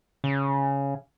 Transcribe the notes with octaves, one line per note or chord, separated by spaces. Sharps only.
C#3